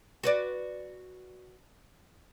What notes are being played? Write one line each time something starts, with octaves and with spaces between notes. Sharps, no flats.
F#4 B4 D5